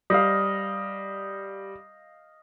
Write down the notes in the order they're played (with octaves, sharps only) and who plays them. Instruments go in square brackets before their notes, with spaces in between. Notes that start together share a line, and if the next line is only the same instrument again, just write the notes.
[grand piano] G3 [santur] D#5 F5